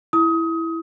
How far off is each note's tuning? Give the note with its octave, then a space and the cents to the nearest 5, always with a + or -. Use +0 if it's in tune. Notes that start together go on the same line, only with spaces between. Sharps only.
E4 +0 D#6 +25